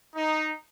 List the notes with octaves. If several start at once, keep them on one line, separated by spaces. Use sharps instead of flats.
D#4